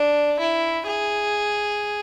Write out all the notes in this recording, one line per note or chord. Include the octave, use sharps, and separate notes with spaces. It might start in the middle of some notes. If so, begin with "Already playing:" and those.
Already playing: D4
E4
G#4